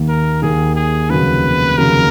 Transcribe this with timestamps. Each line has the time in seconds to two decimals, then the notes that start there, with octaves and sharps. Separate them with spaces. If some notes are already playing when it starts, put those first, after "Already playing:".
Already playing: D#2 D#3 A#3
0.09 A#4
0.42 D#2 D#3 A#3 G#4
0.76 G#4
1.10 F1 D#2 C#3 F#3 A#3 B4
1.77 F1 D#2 C#3 F#3 A#3 A#4